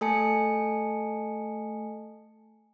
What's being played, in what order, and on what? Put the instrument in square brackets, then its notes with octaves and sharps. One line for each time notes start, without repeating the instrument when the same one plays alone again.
[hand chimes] A3 A4 G#5 A5 C#7